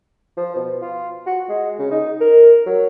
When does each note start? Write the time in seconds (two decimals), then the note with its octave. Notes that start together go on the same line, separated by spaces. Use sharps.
0.37 F3
0.55 B2
0.82 F4
1.27 F#4
1.49 G#3
1.79 C#3
1.91 D#4
2.21 A#4
2.66 F#3